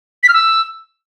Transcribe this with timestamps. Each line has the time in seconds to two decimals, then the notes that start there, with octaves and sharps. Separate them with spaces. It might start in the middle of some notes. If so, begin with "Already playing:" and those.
0.23 B6
0.28 F6
0.34 E6